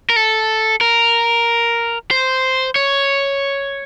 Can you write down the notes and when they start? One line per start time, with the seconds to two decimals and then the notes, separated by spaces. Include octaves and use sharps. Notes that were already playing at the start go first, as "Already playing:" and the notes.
0.10 A#4
0.16 A4
0.81 A#4
2.11 C5
2.76 C#5